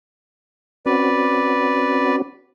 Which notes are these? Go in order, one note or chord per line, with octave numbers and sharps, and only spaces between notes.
C4 C#4 F#4 B4 D5